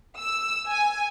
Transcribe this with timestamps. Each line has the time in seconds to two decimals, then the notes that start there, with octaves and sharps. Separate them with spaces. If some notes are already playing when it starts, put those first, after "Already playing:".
0.19 E6
0.69 G#5